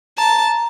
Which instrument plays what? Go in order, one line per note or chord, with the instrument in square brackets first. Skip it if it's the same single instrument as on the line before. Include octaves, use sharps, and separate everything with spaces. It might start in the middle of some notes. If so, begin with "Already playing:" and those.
[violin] A5 [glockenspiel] A#5